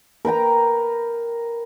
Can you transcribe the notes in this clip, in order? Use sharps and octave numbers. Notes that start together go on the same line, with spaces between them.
A#4 B4 G5 A#5